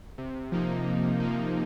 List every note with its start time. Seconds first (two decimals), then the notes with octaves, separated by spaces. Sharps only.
0.18 C3
0.52 F3 A#3 D#4
0.86 C3
1.20 F3 A#3 D#4